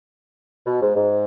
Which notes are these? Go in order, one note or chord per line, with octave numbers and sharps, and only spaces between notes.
B2
G#2
G#2